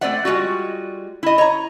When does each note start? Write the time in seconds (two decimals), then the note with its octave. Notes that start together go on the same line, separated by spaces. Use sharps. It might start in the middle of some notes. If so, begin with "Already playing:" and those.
0.01 A3 C4 C5 D5 E5 F#5
0.25 G3 G#3 F4 F#4
1.23 E4 D#5
1.38 C#5 A#5